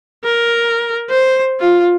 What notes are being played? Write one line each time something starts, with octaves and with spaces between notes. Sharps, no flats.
A#4
C5
F4